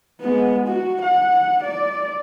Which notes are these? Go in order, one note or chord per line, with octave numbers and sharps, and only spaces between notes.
G#3 B3
F#4
F#5
D5